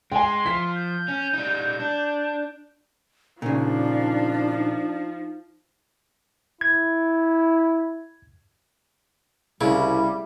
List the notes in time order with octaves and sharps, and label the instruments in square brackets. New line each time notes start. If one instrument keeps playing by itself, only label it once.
[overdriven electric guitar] G#3 [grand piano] G5 G#5 [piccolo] C6
[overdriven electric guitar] F3 [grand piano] B6
[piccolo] G6
[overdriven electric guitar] C#4
G3 D#4
D4
[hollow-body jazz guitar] A#2 C#3 [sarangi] F3 [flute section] D4 [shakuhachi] D#4
[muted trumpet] E4 [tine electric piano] G#6
[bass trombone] C2 [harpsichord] C#3 [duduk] G3 [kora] E4